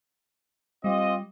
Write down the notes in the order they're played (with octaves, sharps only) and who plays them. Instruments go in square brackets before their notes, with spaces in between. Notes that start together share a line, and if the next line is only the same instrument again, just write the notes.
[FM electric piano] G3 [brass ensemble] C4 F4 D#5